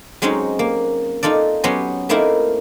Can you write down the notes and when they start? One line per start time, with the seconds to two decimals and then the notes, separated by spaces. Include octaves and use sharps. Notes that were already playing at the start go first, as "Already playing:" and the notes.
0.22 F#3 G#3 C4 C#4 D#4
0.59 A#3
1.23 D#4 F4 A4 D5
1.64 F#3 B3 C#4 G4 C5 A#5
2.09 A3 A#3 C4 D#4 E4 A#4